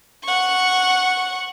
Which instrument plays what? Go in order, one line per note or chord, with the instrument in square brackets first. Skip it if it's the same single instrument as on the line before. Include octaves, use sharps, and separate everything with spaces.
[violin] F#5 C#6